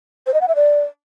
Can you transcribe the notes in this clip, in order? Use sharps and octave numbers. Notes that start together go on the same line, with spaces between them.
C5
D#5
F#5
E5
D5